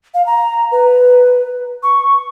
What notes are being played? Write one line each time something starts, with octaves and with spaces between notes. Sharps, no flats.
F5
A#5
B4
C#6